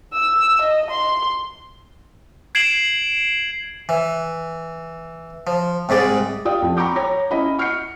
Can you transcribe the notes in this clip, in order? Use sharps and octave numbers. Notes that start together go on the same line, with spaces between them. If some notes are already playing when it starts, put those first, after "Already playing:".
E6
D#5
C6
G#6 C7 D7 E7 F#7
E3
F3
C2 G#2 G#3 D5
F4 G4 D5 F5 G5 D#6
F2
G5 A#5 B5 C#6 D6 G6
C#5 A#5 D6 A#6
C#4 E4 D#5 B5
C#6 F6 G6 C7 C#7